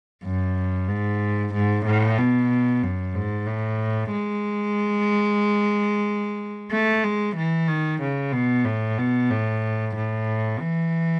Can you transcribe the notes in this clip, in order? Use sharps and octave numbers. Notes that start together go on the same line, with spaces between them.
F#2
G#2
G#2
A2
B2
F#2
G#2
A2
G#3
A3
G#3
E3
D#3
C#3
B2
A2
B2
A2
A2
E3